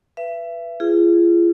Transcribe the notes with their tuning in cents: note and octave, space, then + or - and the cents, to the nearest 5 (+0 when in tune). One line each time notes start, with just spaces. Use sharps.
B4 +0 E5 +35
F4 -40 G#4 +0